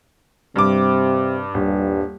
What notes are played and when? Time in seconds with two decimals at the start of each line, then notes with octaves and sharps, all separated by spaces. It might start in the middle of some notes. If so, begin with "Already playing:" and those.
0.56 G2 C3 D6
1.54 D#1 G2